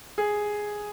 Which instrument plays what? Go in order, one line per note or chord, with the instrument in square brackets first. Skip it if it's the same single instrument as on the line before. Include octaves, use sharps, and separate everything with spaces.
[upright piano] G#4